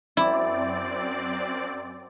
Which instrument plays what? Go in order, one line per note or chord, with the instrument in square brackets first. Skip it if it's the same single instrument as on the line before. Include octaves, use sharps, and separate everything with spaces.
[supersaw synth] F#2 C4 D5 [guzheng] E4